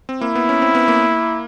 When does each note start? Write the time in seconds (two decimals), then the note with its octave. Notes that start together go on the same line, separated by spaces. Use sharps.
0.09 C4
0.21 A#3 E4
0.35 B3
0.49 C#4
0.62 C4
0.75 B3
0.88 A#3